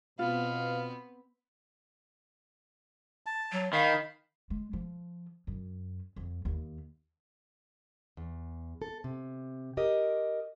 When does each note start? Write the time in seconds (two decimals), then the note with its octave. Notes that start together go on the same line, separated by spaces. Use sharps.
0.19 B2 B3 C4 F4 F5
3.26 A5
3.52 F#3
3.73 D#3 F5 B5
4.50 G#3
4.73 F3
5.47 F#2
6.16 F2
6.45 D#2
8.17 E2
8.82 A4
9.04 C3
9.77 G4 A#4 D#5